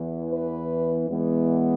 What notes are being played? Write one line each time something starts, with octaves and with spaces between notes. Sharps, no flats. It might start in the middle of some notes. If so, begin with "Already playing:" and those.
Already playing: E2 E3 B3
B4
E2 E3 G#3 B3